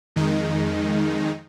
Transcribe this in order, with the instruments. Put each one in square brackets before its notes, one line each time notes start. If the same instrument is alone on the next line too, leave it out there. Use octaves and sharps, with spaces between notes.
[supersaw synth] F2 D#3 G#3 D#4